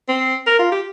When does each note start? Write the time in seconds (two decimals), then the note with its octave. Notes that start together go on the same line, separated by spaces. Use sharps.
0.08 C4
0.47 A#4
0.59 F4
0.72 G4